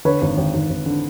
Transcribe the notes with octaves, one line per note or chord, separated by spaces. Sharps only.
D3 B4 C#5
G#1
G#1
G#1
G#1
D3